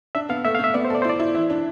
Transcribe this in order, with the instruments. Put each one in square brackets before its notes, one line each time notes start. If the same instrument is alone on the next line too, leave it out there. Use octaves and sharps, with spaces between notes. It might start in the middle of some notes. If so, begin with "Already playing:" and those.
[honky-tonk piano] D4 [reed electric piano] E5
[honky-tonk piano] B3 [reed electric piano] F5
[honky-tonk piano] A3 [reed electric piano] E5
[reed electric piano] F5
[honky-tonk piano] A3 [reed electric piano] E5
[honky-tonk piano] B3 [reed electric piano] D5
[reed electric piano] C5
[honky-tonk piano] A4 [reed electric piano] D5
[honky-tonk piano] E4 [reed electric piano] C5
[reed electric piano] D5
[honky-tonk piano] E4
[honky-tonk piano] E3 [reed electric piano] E5
[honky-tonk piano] D4